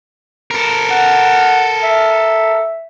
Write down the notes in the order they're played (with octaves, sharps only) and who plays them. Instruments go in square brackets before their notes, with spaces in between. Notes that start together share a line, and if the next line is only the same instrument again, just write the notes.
[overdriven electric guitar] A4 A#4
[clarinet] F#5
E5